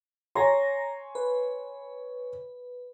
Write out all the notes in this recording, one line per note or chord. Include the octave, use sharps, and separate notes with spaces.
C#5 G#5 A#5 C6 A#6
B4